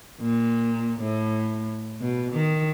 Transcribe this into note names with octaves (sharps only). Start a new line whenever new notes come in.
A#2
A2
B2
D#3